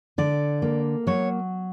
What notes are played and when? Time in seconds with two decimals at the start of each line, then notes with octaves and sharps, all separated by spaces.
0.18 D3 D5
0.62 A#3
1.07 F#3 C#5